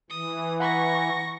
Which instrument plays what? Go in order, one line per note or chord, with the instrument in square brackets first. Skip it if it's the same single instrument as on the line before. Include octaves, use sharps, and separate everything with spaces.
[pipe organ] E3 [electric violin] D#6
[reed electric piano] F#5 A#5 B5 [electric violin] C#6 A#6